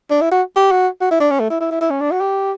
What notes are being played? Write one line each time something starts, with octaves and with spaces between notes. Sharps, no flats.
D4
E4
F#4
G4
F#4
F#4
E4
D4
C#4
A3
E4
E4
E4
E4
C#4
D4
F#4
G4